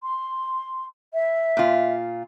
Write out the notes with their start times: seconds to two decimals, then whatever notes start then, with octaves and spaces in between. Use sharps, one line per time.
0.03 C6
1.13 E5
1.57 A#2 F4